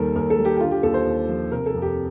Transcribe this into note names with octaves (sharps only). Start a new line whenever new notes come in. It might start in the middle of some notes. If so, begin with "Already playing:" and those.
Already playing: D#2 D#3 G3 A4 A#4
D#2 A#4
A4
G3
G4
G4
D3 F4
G4
D#2 A4
C5
D#2
F3
C3 A#4
A4
F2
G4